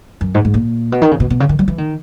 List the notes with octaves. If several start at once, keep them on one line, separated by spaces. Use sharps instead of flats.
F#2
G#2
G#2
A#2
B2
D#3
C#3
B2
B2
C#3
D#3
F#3
E3
D#3